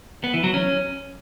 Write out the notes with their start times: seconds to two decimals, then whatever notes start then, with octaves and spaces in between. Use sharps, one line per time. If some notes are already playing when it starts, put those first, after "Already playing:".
0.24 B3
0.34 E3
0.44 F#3
0.54 C#4